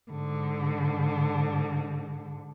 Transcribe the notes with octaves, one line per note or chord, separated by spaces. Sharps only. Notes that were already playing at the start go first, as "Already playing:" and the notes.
G#2 D3